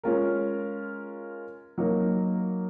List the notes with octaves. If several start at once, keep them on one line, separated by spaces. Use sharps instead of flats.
G#3 C#4 F4 A#4
F#3 A#3 D#4